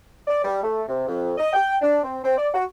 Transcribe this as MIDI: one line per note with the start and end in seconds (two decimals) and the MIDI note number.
0.28 0.43 74
0.44 0.61 55
0.63 0.82 57
0.89 1.03 48
1.07 1.32 41
1.38 1.50 75
1.53 1.76 79
1.82 2.02 62
2.03 2.17 60
2.24 2.33 60
2.37 2.47 74
2.54 2.64 66